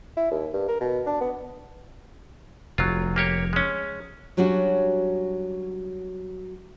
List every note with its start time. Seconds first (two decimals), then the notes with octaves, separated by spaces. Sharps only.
0.17 E4
0.31 D#2
0.53 G2
0.68 A#4
0.81 B2
1.06 D4
1.21 B3
2.78 F1 F#3 F4
3.16 A#3 G4 C#5
3.53 G#3 C#4
4.37 F#3 G3 C#4 D4 F#4